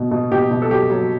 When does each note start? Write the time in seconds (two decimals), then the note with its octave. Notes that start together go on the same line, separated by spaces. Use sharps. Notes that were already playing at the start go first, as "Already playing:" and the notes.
Already playing: B2 F#3
0.11 B2
0.32 B2 G4
0.51 B2
0.62 A4
0.70 F#3 G4
0.90 F#3